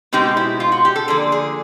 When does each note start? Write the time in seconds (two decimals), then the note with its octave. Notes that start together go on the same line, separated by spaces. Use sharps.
0.13 B2 G#3 C4 D#4 G4
0.37 E4
0.60 F4
0.72 F#4
0.85 G4
0.96 A4
1.08 D3 F3 A#3 G#4
1.32 G#4